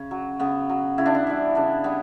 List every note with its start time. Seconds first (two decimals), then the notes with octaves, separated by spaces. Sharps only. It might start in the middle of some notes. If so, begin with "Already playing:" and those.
Already playing: C#3 C#4
0.11 F#3
0.39 C#3 B3
0.69 F#3
0.98 C#3 E4
1.06 D4
1.15 E4
1.27 E3 G3
1.55 C#3 D4
1.84 G3 B3